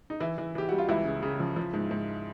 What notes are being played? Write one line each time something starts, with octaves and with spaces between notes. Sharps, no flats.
D#4
E3 E4
E3
E3 G4
G3 F#4
F4
C#2 E3 E4
C#3
C#3
F3
F3
G#2
G#2